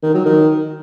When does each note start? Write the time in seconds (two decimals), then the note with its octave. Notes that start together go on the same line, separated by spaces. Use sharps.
0.03 D#3
0.14 F#3
0.25 D#3